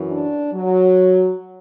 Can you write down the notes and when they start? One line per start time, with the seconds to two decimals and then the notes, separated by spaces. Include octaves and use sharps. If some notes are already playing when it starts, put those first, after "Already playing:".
Already playing: F#2 E3
0.09 D4
0.53 F#3